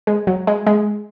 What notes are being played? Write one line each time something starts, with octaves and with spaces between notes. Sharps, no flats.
G#3
F#3
G#3
G#3